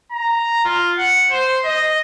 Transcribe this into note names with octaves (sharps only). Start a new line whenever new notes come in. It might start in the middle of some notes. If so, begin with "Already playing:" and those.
A#5
F4
F#5
C5
D#5